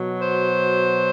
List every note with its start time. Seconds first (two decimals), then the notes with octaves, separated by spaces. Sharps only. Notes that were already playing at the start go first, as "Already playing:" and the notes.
Already playing: B2 F#3
0.21 C5